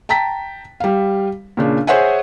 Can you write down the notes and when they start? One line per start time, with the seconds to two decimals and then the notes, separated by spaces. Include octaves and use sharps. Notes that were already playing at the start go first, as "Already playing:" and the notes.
0.09 G5 A5 A#5 B6
0.80 G3 F5
1.57 A#2 C#3 D4
1.87 G#4 C5 C#5 E5 F#5 G#5